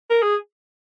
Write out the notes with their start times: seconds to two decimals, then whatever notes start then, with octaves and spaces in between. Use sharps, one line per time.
0.10 A#4
0.22 G#4